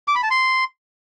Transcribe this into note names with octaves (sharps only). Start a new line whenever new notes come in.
D6
B5
A5
C6